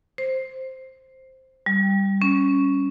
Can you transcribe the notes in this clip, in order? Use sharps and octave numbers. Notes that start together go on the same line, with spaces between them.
C5
G3
C#4